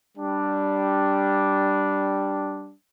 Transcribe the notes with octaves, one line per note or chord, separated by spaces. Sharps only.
G3 D4